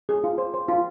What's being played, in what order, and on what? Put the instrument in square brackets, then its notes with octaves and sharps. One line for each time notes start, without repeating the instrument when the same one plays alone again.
[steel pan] G#4
F4
C5
C5
F4